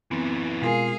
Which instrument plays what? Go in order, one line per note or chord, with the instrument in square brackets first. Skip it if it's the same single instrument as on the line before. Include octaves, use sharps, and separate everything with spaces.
[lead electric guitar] F#2 E3 [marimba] B3 C4
[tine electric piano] B2 F4 [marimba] G#3 A#4 G#5 [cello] G#4 F5